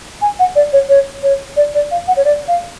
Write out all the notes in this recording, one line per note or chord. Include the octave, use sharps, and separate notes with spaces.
G#5
F#5
D5
C#5
C#5
C#5
D5
D5
F5
F#5
C#5
D5
F5